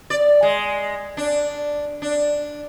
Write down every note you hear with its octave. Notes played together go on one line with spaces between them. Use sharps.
D5
G#3
D4
D4